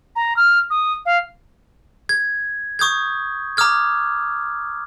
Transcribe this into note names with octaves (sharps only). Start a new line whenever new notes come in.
A#5
F6
D#6
F5
G#6
C#6 D#6 G6 G#6
A#5 D6 D#6 F6 G#6